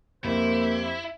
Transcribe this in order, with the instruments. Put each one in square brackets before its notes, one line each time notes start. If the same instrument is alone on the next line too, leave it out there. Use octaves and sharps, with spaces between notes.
[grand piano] F2 [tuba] A#3 [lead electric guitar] E4 [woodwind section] G4 C5